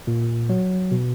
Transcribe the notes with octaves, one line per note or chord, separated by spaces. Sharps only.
A#2
F#3
B2